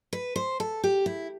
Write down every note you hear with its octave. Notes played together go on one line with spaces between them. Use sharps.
B4
C5
A4
G4
E4